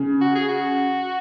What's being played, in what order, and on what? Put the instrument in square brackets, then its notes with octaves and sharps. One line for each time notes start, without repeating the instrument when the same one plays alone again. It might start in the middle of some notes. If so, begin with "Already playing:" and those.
Already playing: [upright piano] C#3
[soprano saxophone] F#4
G#4
F#4